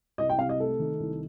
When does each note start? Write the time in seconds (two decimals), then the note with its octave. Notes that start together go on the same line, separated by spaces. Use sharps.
0.18 C2 D#5
0.29 G5
0.39 C3 F5
0.49 D#5
0.60 A3 A4
0.79 D#3
1.00 C2